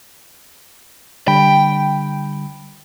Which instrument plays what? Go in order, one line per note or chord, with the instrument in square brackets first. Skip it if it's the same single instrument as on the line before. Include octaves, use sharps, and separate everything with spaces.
[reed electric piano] D3 G3 B5 [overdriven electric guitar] G5